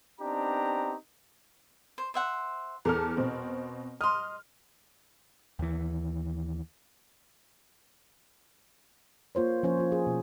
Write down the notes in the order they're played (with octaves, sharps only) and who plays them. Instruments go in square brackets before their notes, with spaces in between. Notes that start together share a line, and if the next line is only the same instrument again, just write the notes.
[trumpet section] B3 C4 D4 D#4 G4 A#5
[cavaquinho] C5
C5 E5 F#5
[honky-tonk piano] E2 A4 F6 [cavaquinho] A#4
[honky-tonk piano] B2 C4
[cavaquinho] D#5 C6 [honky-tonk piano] F6
[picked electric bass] D#2 E3
[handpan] A#3 F4 C5 C#5
F3 A#3 C#4 E4 C5 C#5
A#3 F4
G#4
B2